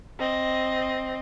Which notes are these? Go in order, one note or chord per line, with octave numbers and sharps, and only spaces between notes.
C4 D#5